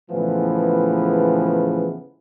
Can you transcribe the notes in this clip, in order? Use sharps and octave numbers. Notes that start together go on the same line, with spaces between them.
A2 C#3 E3 F3 G#3 B3